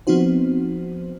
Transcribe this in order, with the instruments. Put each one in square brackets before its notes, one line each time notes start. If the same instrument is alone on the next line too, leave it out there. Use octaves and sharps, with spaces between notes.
[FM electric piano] F3 B3 C4 D#4 F#4 C5